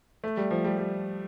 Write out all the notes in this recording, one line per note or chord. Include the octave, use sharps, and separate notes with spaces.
A3
G3
F3
G3
G3